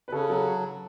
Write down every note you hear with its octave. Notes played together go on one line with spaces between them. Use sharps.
B4
C#3 A4
F#3 A4